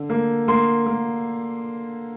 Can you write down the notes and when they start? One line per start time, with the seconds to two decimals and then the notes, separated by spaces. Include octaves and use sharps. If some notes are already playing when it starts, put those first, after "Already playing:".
Already playing: D3
0.10 A#3
0.48 A#3 C6
0.86 A#3